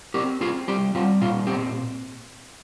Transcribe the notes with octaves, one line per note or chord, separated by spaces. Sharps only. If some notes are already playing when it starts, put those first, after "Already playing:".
C4 G4 A#4
C4 F4 G#4
G3 G4
G3 F4
A#2 F4
C4 G4